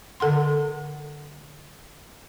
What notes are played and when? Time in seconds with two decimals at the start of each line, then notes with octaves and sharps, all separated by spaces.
0.20 D3 A4 F#5 C6